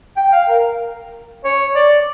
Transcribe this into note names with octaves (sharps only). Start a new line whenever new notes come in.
G5
F5
A#4
C#5
D5